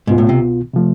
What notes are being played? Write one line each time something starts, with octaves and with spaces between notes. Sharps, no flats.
C2 G#2 B2 B3 F4
A2
C3
C3 F3 A3